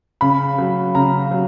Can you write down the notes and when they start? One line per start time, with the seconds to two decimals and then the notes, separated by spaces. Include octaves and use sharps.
0.21 C#3 B5
0.58 F#3
0.95 C#3 A#5
1.31 F#3